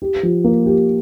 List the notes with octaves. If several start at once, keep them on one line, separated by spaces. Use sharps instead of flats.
G4
F3
A#3
G4